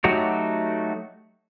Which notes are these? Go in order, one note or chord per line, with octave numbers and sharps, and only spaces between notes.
F#3 A3 D#4 F#4 G4